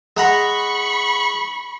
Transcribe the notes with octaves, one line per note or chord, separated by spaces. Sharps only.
G#3 F#5 A#5 B5 C#6